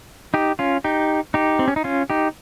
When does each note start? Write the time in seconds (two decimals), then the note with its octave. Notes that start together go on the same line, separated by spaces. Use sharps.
0.34 D#4 G4
0.59 C#4 F4
0.84 D#4 G4
1.34 D#4 G4
1.59 C4
1.68 C#4
1.76 D#4
1.84 C#4 F4
2.10 D#4 G4